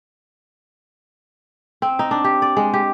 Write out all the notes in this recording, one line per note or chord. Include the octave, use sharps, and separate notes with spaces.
C4
D#4
D4
G4
D5
G#3
G4